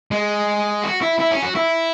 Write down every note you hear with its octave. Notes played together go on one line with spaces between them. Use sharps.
G#3
F#4
E4
E4
C#4
F#4
E4